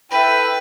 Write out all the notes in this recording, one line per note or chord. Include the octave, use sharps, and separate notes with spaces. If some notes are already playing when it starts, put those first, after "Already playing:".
E4 A4 B4 E5 G5